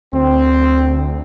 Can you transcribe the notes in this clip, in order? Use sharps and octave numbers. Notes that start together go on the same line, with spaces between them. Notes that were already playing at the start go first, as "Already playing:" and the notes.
D2 C4